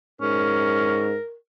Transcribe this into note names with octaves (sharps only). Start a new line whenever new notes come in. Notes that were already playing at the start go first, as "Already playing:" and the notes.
G#2 C#4 A#4